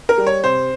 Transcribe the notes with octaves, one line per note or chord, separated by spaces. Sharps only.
A#4
G3
C#5
C3 C5